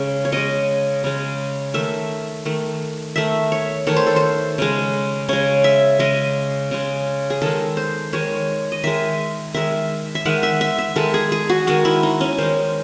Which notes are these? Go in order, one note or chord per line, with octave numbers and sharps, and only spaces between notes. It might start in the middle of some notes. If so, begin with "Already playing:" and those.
Already playing: C#3 G#3
C#5
C#3 G#3 D#5
C#3 G#3
D#3 A3 E5
D#3 A3
D#3 A3 E5
C#5
D#3 A3 C#5
C5
A4
C5
C#3 G#3
C#3 G#3 C#5
E5
C#3 G#3 D#5
C#3 G#3
G#4
D#3 G#3 A4
C5
D#3 G#3 C#5
D#5
D#3 G#3 E5
D#3 G#3 E5
E5
D#3 G#3 F#5
E5
E5
E5
D#3 G#3 A4
G#4
G#4
F#4
D#3 G#3 F#4
E4
D#4
C#4
D#3 G#3 C5